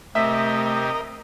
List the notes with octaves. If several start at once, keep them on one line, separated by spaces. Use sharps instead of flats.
C3 A3 C4 G4 A#4 D#5 E5